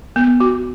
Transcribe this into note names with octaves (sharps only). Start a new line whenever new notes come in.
B3
F#4